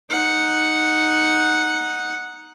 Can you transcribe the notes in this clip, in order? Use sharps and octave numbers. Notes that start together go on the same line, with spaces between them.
D#4 F#5